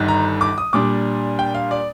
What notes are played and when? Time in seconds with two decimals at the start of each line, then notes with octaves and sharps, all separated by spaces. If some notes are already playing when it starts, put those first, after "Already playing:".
Already playing: G1 G2 D#3
0.08 A#5
0.41 D6
0.58 D#6
0.73 A#2 G3 D4 D6
1.39 G5
1.55 F5
1.71 D5